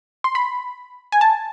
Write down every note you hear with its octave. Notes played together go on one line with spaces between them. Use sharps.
C6
B5
G#5
A5